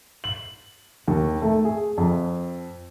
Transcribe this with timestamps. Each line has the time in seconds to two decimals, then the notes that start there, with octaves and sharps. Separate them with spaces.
0.24 F#7
1.08 D#2
1.42 A3
1.65 G#4
1.98 F2